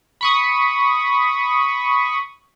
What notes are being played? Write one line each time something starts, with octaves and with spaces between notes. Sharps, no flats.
B5 C#6 D#6